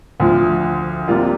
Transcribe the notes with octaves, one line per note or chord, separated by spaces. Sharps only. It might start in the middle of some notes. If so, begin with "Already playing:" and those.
D2 D3 F3
C3 G3 A#3 F4